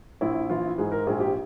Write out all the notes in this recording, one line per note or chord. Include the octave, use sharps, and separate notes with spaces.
A#1 E4
E3 F4
G#2 G#4
A#4
A#1 G#4
G4